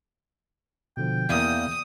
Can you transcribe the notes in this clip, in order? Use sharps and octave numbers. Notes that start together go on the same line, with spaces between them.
B2 D3 F3 G5
E2 A#3 D5 F5 D#6